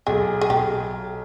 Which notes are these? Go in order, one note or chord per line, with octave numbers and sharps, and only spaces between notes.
B1 G#4
G#4
B1 G4